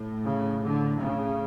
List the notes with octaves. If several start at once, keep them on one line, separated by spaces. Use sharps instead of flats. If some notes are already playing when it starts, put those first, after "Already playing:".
Already playing: A2
C#3
D3
A2 C#3